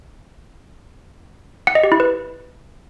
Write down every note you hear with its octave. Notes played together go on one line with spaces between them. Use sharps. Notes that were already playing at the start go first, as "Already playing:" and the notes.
F#5
D#5
G4
E4
B4